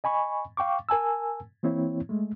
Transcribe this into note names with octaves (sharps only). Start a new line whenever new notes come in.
D#5 G#5 B5 C#6
F5 G5 C#6 D6
A#4 G#5 A5 E6
E3 A#3 C4 E4 C#5
G#3 A3